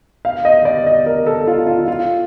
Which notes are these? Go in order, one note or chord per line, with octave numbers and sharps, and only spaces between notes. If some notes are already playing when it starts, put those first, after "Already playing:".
F5
D#5
D5
D#5
A#4
A4
F4
F4
F4